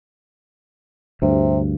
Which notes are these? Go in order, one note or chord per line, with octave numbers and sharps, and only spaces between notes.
D2 G2 C3